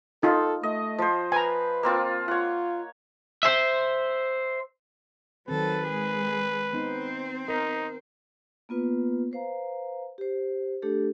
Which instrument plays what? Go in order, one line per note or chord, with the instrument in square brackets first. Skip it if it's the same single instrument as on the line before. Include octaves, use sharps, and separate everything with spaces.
[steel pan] D#4 F4 [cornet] A4
[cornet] A3 [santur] D#5
[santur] F3 C5
[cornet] B4 [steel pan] G#5 A#5
[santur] A#3 C4 F4
[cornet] F4 [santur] C#5 F#5
[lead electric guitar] C5 E5
[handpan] D#3 C4 [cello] F#3 A4 [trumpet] B4
[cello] G#3 G#4
[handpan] B3 D#4 [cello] C4 C5
[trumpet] D#4 [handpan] A#4
[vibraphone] A#3 B3 F4 B4
B4 C5 F5 A#5
G4 C5
A3 D4 G4 A4